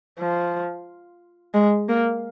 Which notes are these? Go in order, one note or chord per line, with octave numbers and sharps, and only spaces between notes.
F3
G#3
A#3